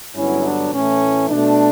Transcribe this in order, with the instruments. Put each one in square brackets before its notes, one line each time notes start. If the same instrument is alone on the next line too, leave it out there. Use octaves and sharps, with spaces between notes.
[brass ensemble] G2 D3 F#3 B3 C#4 E4
D4
A2 E3 A3 C#4
B2 A3 D4